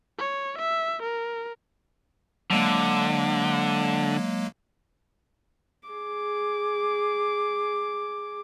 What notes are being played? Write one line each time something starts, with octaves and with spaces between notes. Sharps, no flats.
C#5
E5
A#4
D3 F#3 G#3 A#3
G#4 D6